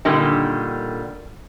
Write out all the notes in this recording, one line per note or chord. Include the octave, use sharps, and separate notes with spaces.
A#2 D3 D#3 G3